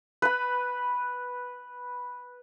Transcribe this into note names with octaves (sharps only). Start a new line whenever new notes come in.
B4 B5